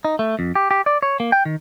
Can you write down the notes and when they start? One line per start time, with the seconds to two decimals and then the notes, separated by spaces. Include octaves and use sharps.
0.05 D#4
0.19 A3
0.39 F2
0.55 G4
0.71 G4
0.86 D5
1.03 C#5
1.20 A#3
1.32 G5
1.45 D#3